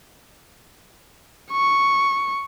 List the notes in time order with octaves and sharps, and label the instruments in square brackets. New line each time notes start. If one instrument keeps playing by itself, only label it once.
[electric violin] C#6